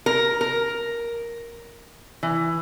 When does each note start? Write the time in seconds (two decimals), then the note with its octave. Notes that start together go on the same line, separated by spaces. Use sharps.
0.06 A#4
0.41 A#4
2.23 E3